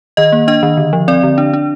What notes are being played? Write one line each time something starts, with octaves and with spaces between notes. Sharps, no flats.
D#3 D#5
A#3
D4 D#5
D#3
D3
F3
C4 D5
D3
D4
D4